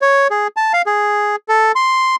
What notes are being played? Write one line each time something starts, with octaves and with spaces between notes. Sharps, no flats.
C#5
G#4
A5
F5
G#4
A4
C6